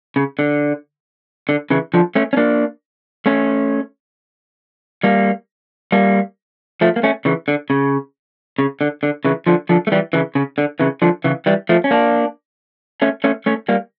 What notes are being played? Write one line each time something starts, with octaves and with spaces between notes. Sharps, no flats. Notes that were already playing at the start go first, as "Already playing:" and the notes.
C#3
D3
D3
C#3 E3
D3 F3
A3 C#4
C#4
A#3 D4
A3 C#4
G3 A#3
G3 A#3
F3 A3
A#3
A3 C#4
C#3 E3
D3
C#3
C#3
D3
D3
C#3 E3
D3 F3
D3 F3
A3
E3 G3
C#3 E3
C#3
D3
C#3 E3
D3 F3
C#3 E3
E3 G3
F3 A3
C#4
A#3 D4
A3 C#4
A3 C#4
A3 C#4
G3 A#3